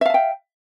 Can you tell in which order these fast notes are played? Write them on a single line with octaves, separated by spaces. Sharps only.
E5 F5 A5 G5